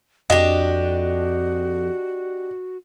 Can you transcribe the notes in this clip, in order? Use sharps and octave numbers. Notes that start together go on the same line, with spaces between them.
F2 D4 F#4 G4 D#5